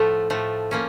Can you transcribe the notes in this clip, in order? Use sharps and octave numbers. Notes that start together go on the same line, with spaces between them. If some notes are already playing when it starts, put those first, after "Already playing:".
Already playing: A2 F3 A3
A2 F3 A3
F3 A#3 C#4